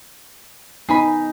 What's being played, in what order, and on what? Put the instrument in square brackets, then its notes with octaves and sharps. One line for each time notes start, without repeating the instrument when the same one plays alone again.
[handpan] B3 D#4 [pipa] G#4 G#5 B5